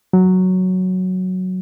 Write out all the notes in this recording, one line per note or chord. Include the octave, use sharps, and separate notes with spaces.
F#3